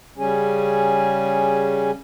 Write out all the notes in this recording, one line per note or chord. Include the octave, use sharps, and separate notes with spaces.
C#3 G3 C#4 G#4